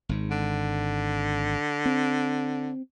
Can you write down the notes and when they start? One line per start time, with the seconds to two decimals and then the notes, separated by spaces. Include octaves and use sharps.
0.09 G#1 G#2
0.31 D3
1.86 C4